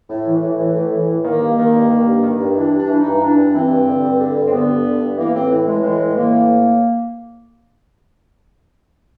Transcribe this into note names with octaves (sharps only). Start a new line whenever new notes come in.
A2
E3
A2
E3
A2
E3
A2
D#3 A#3
G2
D#3
G2
D#3
G2
D#3
G2
E3 D4
G2 D4
E3
D#4
G2
E3 D4
G2
E3 C4
G2
D3
G2
D3
G2
C4
D3 B3
G2
D3
G2
E3 A#3
A2 C4
E3
A2 G#3
E3 G#3
A2
E3 A#3
A2